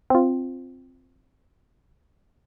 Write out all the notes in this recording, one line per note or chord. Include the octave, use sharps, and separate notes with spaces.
C4 F4